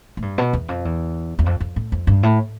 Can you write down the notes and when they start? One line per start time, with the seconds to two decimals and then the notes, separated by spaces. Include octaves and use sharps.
0.17 A2
0.22 G2
0.38 B2
0.53 E2
0.69 F2
0.85 E2
1.39 E2
1.46 F2
1.60 F2
1.76 A2
1.92 F2
2.07 G2
2.23 A2